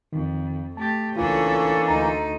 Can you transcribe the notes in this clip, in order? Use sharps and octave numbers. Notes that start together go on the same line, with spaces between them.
F2 D#3
A3 G4 A5 A6
C#2 E3 A#3 C#4 D4 F4 A4
D2 D#4 A#5